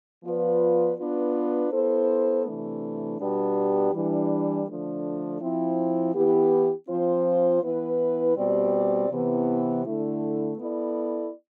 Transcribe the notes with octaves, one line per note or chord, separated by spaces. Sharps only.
F3 B3 F4 B4 D5
B3 D4 F4 B4
B3 E4 A4 C5
C3 E3 A3 D4
B2 G3 B3 D4 G4
E3 G3 D4
D3 F3 A3 D4
F3 C4 E4
E3 B3 E4 G4
F3 C4 F4 C5
E3 B3 E4 B4
B2 G3 C4 G4 D5
C3 E3 B3
D3 A3 E4
B3 E4 A4 D5